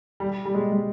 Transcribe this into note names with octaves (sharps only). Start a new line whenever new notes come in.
G3
G3
G#3
G#3